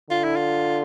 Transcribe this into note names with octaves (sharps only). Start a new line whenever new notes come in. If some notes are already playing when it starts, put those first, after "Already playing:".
D3 F4
E4
F4